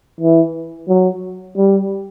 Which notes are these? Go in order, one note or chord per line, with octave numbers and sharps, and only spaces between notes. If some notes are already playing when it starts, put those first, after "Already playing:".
E3
F#3
G3